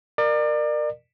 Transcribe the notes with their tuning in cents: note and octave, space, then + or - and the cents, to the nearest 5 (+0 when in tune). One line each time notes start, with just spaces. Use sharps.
A#4 +0 D5 +35